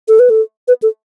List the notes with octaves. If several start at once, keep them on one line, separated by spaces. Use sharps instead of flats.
A4
B4
A4
B4
A4